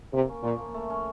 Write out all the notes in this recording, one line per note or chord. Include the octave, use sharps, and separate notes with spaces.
C3 A#3
C#4
A#2 F3
A#3
A3
C#4